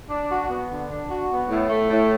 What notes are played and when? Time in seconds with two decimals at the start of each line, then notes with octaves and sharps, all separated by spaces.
0.09 D4
0.29 F#4
0.49 B3
0.70 D3
0.90 D4
1.09 F#4
1.30 B3
1.49 A2
1.69 A3
1.90 A2